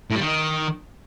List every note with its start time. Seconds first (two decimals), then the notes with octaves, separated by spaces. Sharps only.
0.11 A2
0.16 G3
0.21 D#3